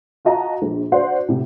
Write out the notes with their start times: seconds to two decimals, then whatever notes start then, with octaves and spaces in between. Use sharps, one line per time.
0.25 F4 F#4 D#5 A5 A#5
0.62 A#1
0.92 F#4 C5 D5 F#5 C6
1.29 A2 C3